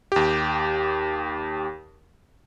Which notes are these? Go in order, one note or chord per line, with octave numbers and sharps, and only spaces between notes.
D#2 G4